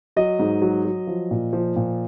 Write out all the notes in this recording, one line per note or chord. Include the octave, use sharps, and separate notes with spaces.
F#3 D#5
G#2
F#3
F#3
F3
A#2
F3
A#2